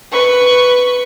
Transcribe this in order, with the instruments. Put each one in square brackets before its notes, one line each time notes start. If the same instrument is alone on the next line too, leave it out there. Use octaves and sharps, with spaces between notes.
[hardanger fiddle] B4 C#6